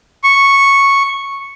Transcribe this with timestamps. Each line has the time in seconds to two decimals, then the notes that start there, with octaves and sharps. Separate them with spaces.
0.24 C#6